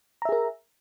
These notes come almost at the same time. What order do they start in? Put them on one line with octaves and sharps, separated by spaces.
A#5 E5 G#4 A#4